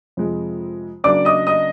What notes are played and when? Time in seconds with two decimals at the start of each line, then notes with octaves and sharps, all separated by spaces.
0.17 F2 C3 F3 G#3
1.04 C#3 F#3 A#3 D4 D5 D6
1.25 D#5 D#6
1.47 D#5 D#6